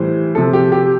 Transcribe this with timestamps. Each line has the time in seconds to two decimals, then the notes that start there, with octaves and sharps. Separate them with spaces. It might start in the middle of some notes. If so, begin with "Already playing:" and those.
Already playing: A2 E3 G3 C5
0.35 C3 F3 A4
0.53 G4
0.72 G4